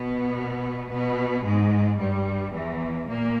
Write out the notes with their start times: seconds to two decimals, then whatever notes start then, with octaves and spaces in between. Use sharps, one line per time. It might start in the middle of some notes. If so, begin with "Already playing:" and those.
Already playing: B2 B3
0.92 B2 B3
1.45 G#2 G#3
1.99 G2 G3
2.53 E2 E3
3.08 A#2 A#3